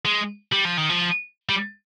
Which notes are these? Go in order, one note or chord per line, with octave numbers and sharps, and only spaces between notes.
G#3
G3
F3
D#3
F3
G3